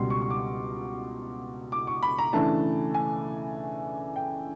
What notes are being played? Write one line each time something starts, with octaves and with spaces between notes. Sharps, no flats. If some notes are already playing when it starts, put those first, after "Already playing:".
Already playing: C#2 B2 G3 C6
C#6
C#6
D6
D6
C#6
B5
A#5
C#3 E3 A3 D4 A5
G#5
G5